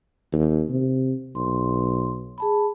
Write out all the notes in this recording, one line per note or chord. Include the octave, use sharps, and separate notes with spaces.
D#2
C3
B1 C6
G#4 A5 B5